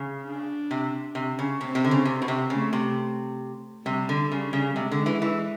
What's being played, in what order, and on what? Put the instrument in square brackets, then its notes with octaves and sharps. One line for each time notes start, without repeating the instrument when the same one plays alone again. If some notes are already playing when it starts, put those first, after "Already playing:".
Already playing: [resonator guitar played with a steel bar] C#3
[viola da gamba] D4
[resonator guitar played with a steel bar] C3
C3
C#3
[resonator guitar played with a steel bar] C3 [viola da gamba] C4
[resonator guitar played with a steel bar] C3
D3
C#3
C3
B2
C3
[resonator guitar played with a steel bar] C#3 [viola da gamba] A3
[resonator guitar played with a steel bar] C3
[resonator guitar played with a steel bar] C3 [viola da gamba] G3
[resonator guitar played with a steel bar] D3
C#3
C#3
[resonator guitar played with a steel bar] C3 [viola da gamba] G#3
[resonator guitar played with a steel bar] D3
E3
E3